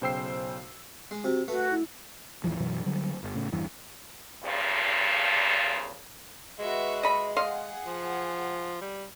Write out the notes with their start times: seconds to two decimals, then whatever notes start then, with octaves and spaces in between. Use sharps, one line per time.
0.02 B1 C#3 C5 G5 E6 C7
1.11 G#3
1.24 C3 F#4
1.48 A3 F#4 B4
1.71 E4
2.44 G#1 D#2 E3 F3
2.60 F#2 B2 E3 F#3
2.86 D3 F#3 G3
3.22 G1
3.35 A2 C#3
3.52 D1 E2 G2 E3
4.43 E2 G2 A#2 C#3 F3
6.59 G#3 F#4 B4 E5
7.03 D#5 B5
7.37 G#4 D#5 F5 F#5 C6
7.87 F3
8.81 G3